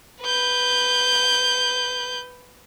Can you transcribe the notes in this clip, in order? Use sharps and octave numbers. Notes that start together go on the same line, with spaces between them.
B4 G6